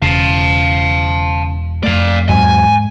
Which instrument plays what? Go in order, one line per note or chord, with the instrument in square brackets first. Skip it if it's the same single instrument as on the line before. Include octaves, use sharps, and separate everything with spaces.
[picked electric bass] E1 [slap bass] C#3 [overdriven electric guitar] F5 A5
[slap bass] F2 A3 [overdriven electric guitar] D5 F5
[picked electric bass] E2 F#3 C4 [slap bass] G#2 [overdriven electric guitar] G#5